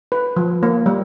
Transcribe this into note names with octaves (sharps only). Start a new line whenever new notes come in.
B4
F3
A#3
G3